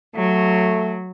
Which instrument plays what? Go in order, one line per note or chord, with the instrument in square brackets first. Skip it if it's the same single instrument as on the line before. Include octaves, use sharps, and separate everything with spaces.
[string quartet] F#3 [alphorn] A3